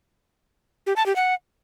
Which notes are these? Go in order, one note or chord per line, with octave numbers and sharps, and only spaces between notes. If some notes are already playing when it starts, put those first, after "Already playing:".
G4
A5
G4
F#5